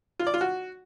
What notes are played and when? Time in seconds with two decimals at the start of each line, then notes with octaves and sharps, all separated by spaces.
0.19 F4
0.27 D5
0.34 F4
0.41 F#4